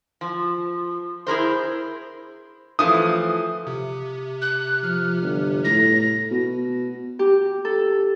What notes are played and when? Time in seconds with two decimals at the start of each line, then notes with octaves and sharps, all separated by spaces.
0.21 F3
1.27 E4 G#4 A#4 C5
2.79 E3 F3 A3 D#6
3.67 C3
4.42 F#6
4.83 F3 F6
5.22 G1
5.65 A2 A#6
6.31 B2
7.19 G4
7.65 A4